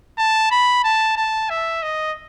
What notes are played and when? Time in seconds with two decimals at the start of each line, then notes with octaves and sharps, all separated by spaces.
0.18 A5
0.51 B5
0.84 A5
1.17 A5
1.50 E5
1.82 D#5